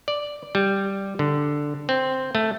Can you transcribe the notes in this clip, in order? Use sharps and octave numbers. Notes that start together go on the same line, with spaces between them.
D5
G3
D3
C4
A3